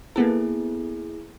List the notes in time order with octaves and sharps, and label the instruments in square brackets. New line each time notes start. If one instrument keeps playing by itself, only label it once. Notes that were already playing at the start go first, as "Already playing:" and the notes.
[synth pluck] A#3 B3 A4 [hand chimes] E4 G#4